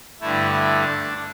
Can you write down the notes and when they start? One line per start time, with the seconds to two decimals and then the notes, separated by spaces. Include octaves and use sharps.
0.20 G2 D3 A3 E4
0.51 E4
0.81 D4